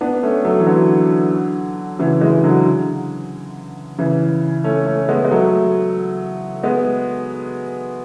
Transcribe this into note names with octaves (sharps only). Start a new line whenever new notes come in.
B3 D4
A3 C#4
F#3 A3
E3
D3 F#3
C#3 E3
E3 G#3
D3 F#3
C#3 E3
A3 C#4
A3 C#4
G#3 B3
G#3
F#3 A3
G#3 B3